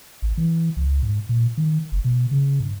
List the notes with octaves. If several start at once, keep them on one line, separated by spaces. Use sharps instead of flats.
A1
E3
C#2
G#2
A#2
D#3
F#1
B2
C#3
G2